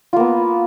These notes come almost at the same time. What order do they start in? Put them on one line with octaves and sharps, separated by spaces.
F4 A#3 B3